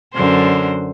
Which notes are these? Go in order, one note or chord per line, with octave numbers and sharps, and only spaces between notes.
F#2 D3 C5